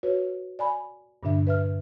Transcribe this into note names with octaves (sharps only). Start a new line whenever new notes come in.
F#4 B4 C#5
D5 G#5 B5
G2 A#2 D3 D4 E5
B4 E5 F6